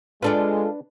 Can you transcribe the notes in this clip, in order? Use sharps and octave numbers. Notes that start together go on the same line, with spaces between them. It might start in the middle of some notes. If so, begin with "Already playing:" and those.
G#3 D4 F4 A4 B4 D5